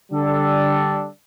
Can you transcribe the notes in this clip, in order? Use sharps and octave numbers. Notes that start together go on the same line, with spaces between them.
D3 G3 D4 A4